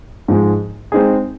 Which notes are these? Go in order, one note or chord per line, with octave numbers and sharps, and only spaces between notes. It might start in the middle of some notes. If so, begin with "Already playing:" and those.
G#2 F3 G#3
G#3 C4 D#4 G#4